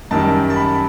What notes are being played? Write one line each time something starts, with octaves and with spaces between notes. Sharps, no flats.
F#2 D#3 G3 A5
A5
B5